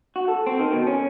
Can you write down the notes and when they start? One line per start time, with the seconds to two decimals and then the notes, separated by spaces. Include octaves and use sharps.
0.16 F#4
0.28 A4
0.47 C4
0.60 D#3
0.73 B2
0.87 C#4